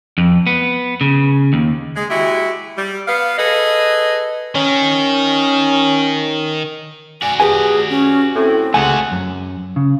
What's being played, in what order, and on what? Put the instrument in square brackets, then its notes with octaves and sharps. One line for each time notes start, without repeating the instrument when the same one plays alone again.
[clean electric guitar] F2
B3
C#3
D#2
[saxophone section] G#3
G#3 E4 F#4 G4 E5
G3
B3 F5
G#4 A4 B4 D#5
[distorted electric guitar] D#3 [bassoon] C#4
[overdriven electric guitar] F#4 D5 [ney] G#5
[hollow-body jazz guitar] G4 B4 G#5 [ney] G#4
[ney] C#4
[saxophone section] A2 [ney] C4
[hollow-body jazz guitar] C#2 G#5 [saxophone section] C3 G#4 F#5 [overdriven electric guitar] A3 F#4
[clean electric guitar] F#2
C#3